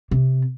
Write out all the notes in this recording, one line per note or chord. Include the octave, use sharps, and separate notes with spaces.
C3